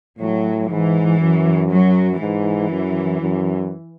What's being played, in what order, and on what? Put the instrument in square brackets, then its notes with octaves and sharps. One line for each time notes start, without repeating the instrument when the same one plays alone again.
[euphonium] A2 [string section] F#3
[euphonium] G#2 [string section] E3
[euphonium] F#2
[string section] F#3
[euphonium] G#2 [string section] E3
[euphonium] F#2
F#2